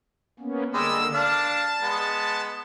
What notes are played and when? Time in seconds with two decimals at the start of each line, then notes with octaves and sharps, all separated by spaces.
0.40 A#3 B3 C#4
0.74 D3 G3 G#3 A#3 E6
1.14 D4 F5 A5
1.82 G#3 B3